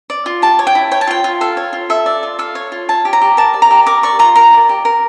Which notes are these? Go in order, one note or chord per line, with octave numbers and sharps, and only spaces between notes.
D5
F4
G4 A5
C#5
G5
E4
C#5 G5
A5
F4 G5
F4
A4 F5
C#5
F4
A4 E5
D5
F4
A4 F5
C#5
F4
C#5 A5
G4
A#5
G4
A#4 A5
D5
A#5
G4
A#4 D6
D5 C#6
F4 A#5
A#4 A#5
D5
G4
A#4